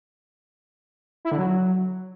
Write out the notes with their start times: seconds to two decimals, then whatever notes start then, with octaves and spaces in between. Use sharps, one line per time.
1.25 E4
1.31 D3
1.38 F#3